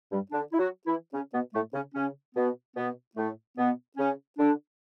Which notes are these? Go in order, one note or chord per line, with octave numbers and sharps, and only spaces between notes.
G2 G3
D3 D4
E4
F#3 F#4
E3 E4
C#3 C#4
B2 B3
A2 A3
C#3 C#4
C#3 C#4
B2 B3
B2 B3
A2 A3
B2 B3
C#3 C#4
D3 D4